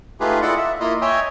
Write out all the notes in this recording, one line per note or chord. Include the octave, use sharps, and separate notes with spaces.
A3 D#4 F4 G4 G#4 B4
E4 F4 A4 D5 D#5 F#5
E5
A#3 E4 F4 D#5
C#5 D#5 E5 G5 G#5